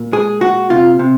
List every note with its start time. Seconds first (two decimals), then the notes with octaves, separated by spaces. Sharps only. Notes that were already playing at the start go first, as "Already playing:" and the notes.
Already playing: A#2
0.12 G#3 G#4
0.41 A#2 F#4
0.70 C3 F4
0.99 C3